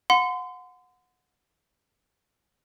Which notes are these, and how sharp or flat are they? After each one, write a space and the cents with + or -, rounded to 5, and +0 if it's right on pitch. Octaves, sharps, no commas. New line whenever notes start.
F#5 -25 C6 -35